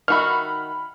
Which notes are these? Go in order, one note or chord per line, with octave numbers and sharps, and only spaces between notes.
D#3 F#4 E5 B5 F6